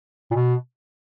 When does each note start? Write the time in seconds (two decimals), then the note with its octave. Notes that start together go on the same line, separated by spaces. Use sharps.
0.31 A#2
0.34 B2